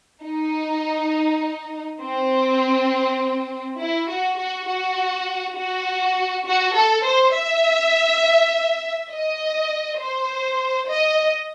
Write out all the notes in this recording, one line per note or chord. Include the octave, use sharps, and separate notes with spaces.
D#4
C4
E4
F#4
F#4
F#4
F#4
F#4
A4
C5
E5
D#5
C5
D#5